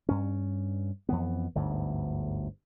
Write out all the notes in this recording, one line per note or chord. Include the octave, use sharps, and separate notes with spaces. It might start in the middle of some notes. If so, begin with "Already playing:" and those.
G2 C#4
F2 E3 B3
G1 D2 G#2